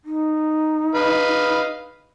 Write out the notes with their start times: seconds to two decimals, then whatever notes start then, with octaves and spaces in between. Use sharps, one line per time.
0.05 D#4
0.95 B4 D#5 F5